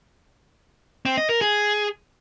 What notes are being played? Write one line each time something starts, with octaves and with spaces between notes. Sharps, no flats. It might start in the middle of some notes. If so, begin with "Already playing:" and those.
C4
D#5
A#4
G#4